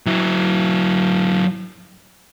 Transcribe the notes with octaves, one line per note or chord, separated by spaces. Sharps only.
F#3 E4